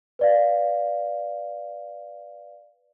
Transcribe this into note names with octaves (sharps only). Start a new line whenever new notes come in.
B4 D5 F5